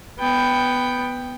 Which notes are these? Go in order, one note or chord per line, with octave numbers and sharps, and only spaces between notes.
B3 G5